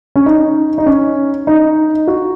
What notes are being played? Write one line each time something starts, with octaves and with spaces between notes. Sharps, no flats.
C#4
D#4
D#4
C#4
D#4
F#4